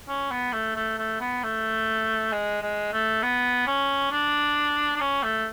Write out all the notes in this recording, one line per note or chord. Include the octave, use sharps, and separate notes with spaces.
C#4
B3
A3
A3
A3
B3
A3
G#3
G#3
A3
B3
C#4
D4
D4
C#4
A3